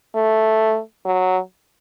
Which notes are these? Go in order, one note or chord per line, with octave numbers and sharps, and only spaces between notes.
A3
F#3